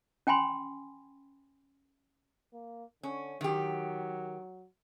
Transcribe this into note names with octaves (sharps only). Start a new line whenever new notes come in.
C#4 G5 G#5 B5 C6
A#3
D3 C#4
D#3 F#3 G4